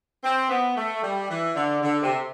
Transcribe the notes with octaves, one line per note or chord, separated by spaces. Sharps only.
C4
B3
A3
G3
E3
D3
D3
C3